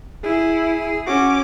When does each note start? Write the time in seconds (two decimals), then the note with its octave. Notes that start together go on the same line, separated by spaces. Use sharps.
0.24 E4 G#4
1.07 C#4 F#4 D6